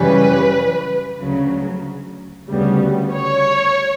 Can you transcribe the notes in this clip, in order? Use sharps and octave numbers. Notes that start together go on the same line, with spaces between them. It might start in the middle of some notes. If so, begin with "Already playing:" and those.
Already playing: F#2 C#3 E3 G3 C#4 B4
D2 C#3 F#3
D2 C#3 G3 B3
C#5